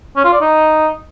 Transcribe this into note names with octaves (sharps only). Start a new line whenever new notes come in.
C#4
F4
D5
D#4